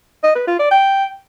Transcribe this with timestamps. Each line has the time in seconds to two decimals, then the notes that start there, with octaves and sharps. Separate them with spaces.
0.23 D#5
0.35 B4
0.47 F4
0.59 D5
0.71 G5